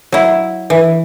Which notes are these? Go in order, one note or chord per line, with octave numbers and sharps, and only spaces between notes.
F#3 E4
E3